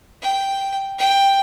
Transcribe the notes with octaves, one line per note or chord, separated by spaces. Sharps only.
G5
G5